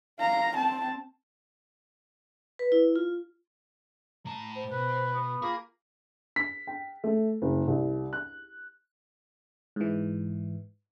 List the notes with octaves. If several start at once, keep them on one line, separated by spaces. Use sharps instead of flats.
F5 A#5
C4 A5
B4
E4
F4
A2 A5 A#5
C5
B2 B4
B3
A#3 F4 G#4 B5
B6
G5
A3
F#1
C2
F#6
G#2 E3